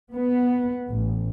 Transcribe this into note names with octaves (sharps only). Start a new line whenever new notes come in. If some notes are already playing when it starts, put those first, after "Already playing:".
B3
A1